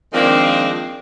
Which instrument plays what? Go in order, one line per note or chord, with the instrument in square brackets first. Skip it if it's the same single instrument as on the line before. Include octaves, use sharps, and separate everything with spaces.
[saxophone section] D#3 F3 G#3 A#3 C4 D4